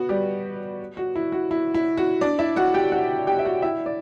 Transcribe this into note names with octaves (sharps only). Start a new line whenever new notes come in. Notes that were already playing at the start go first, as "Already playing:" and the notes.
Already playing: B3 F#4
G3 G4
F#4
E4
F#4
E4
E4
F#4
D4 D5
E4 E5
F#4 F#5
G4 G5
F#4 F#5
G4 G5
E5
F#4 F#5
E4 E5
D5